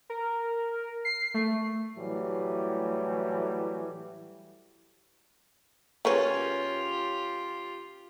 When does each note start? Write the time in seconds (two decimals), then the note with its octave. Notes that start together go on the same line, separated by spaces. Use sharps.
0.10 A#4
1.05 C7
1.34 A3
1.96 A2 E3 F#3 G3 A3
6.05 C#3 F#3 C#4 F4 G4 A#4 B4